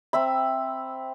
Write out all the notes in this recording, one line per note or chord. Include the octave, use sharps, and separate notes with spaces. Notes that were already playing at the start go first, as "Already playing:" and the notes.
C4 E5 B5